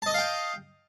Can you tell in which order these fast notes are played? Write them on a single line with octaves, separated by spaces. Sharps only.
A5 D#5 D#6 F5 G5